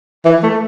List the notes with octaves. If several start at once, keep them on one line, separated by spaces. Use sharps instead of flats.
E3
A3